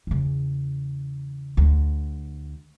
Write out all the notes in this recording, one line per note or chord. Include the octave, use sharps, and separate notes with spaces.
E2 C#3
D2